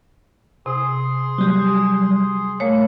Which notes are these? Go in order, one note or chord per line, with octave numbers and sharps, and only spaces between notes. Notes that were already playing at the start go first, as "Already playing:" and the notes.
C3 G#4 C6
F#3 G3
A3 A#3 C#5